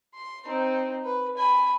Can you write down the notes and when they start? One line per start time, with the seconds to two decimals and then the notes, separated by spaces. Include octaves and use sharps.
0.14 C6
0.45 C4 D#4
1.05 B4
1.37 G#5 B5